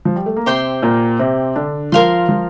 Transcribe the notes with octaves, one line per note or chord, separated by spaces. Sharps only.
F3
G3
A3
A#3
C3 C4 G4 C5 G5 C6
A#2 A#3
C3 C4
D3 D4
F3 F4 A#4 F5 C6
F3 F4